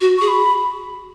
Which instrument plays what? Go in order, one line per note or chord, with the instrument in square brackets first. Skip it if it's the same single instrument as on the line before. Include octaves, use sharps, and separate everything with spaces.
[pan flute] F#4
[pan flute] G#4 [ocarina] C#6
[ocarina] B5